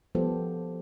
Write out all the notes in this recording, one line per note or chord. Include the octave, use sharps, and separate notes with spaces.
F3 G3 B3 G4 A4 C5